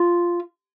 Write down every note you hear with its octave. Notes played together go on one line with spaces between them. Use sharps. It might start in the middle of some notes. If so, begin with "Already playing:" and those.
Already playing: F4